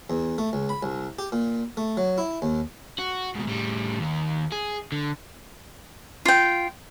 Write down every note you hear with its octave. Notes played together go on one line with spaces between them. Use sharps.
E2
A3
C#2
B5
C2
G4
A#2
A3
F#3
E4
D#2
F#4
G#2 B2
A2 G3
D#2 D#3
G#4
D3
F4 G5